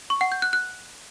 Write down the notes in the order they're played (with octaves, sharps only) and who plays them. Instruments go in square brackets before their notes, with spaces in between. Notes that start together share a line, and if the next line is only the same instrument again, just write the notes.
[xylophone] C#6
F#5
G6
F#6
F#6